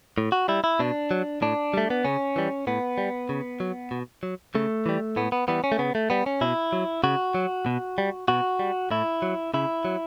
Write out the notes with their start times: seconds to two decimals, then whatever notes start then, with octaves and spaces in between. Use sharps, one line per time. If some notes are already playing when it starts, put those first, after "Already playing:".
0.18 A2
0.32 F#4
0.48 G3 E4
0.64 E4
0.79 B2 D4
1.11 F#3
1.42 A2 D4
1.74 G3 A3
1.90 B3
2.05 C#3 C#4
2.36 E3 G3
2.67 A2 B3
2.98 G3
3.29 C#3
3.60 F#3
3.91 B2
4.23 F#3
4.55 C#3 A3
4.86 E3 G3
5.16 A2 B3
5.32 B3
5.48 E3 G3 B3
5.64 C#4
5.72 A3
5.79 C#3 B3
5.95 A3
6.10 G3 B3
6.26 C#4
6.41 B2 E4
6.73 F#3
7.04 C#3 F#4
7.35 F#3
7.66 B2
7.98 G3
8.28 B2 F#4
8.59 G3
8.91 A2 E4
9.22 F#3
9.54 C#3 E4
9.85 F#3